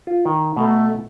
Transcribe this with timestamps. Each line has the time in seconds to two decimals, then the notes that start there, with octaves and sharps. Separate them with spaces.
0.07 F4
0.25 D#3
0.56 B2 A3 A#5